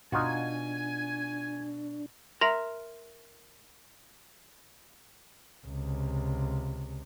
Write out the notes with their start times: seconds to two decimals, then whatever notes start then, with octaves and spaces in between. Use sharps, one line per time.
0.12 B2 D4 D#4 F4 F#4 G#5
2.41 A#4 E5 A#5 C6 A#6 F7
5.67 C#2 C3